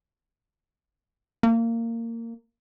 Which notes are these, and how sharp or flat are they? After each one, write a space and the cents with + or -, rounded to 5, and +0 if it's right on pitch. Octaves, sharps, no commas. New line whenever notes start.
A#3 -20